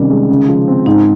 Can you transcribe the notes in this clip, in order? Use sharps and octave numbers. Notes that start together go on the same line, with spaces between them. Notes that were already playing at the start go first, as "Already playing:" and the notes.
Already playing: C3 D#3 G3 C#4
G#3
C#3
F3
C4
G#2 D#4